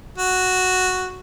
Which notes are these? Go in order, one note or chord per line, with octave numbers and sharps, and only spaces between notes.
F#4